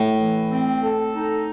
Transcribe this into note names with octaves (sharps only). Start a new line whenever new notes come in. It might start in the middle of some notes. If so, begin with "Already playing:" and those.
Already playing: A2
E3
C4
A4
D#4